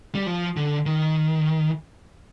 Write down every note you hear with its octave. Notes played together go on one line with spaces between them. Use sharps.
G3
F3
D3
D#3